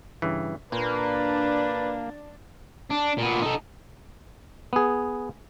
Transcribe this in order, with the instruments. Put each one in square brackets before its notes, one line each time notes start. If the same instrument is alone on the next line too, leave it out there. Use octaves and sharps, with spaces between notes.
[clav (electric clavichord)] G2 C#3 E3
[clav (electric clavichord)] A#2 [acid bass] A#3 [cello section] D4 [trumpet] B4
[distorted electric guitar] D4
A#2 B3
D#4 A4
[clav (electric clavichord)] B3 G#4